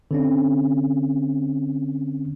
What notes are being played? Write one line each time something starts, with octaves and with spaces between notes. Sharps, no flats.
D3 C4 C#4